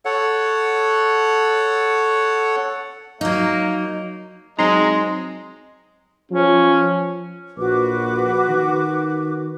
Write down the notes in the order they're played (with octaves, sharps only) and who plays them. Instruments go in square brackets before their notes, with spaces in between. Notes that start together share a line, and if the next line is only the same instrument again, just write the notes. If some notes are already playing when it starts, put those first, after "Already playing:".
[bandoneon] A4 C#5 F#5
[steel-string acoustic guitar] F#3 D#4 [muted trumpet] A#3
[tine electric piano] F#3 C4 D#4 [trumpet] G#3 [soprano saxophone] D#5 [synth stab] A#5 C6
[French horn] F3 [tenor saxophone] C#4
[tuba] A#1 [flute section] F#4 B4 D6
[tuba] D#3